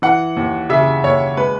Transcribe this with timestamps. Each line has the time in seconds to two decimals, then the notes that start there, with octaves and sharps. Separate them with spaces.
0.02 E3 F#5
0.37 D#2
0.69 C#3 E5
1.04 D#2 C#5
1.37 G#3 B4